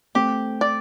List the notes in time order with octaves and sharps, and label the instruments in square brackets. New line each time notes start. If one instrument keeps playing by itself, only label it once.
[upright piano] A3 C4 [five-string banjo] G4
[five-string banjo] D5